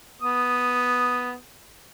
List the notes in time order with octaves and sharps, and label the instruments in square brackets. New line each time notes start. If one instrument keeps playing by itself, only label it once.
[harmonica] B3 D#6